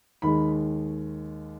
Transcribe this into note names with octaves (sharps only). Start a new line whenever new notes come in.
D#2 D#3 G#3 B5